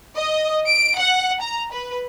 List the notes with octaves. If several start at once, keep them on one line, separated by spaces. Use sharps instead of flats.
D#5
D7
F#5
A#5
B4